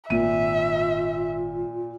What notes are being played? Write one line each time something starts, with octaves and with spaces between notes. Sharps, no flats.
G#1 A#2 F4 E5 D#7